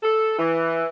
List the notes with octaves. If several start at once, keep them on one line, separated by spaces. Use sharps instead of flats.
A4
E3